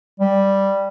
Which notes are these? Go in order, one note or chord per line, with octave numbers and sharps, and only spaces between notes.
G3